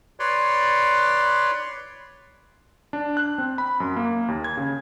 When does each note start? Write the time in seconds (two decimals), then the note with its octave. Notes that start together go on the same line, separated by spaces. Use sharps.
0.20 B4 C#5 D5 C6
2.93 D4
3.17 F#6
3.38 C4
3.58 B5
3.80 F#2
3.96 A#3
4.28 D#2
4.44 G#6
4.57 C#3